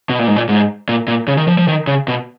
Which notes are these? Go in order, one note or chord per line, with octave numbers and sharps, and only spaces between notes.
B2
A#2
G#2
A#2
G#2
A#2
A#2
C#3
D#3
F3
F3
D#3
C#3
B2